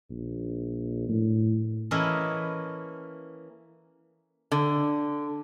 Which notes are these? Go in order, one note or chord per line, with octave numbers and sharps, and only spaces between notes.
A#1
A2
E3 A#3 C#4 A4 B4 D#5
D3